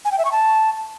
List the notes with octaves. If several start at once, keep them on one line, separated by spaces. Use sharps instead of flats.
G#5
G5
E5
C#6
A5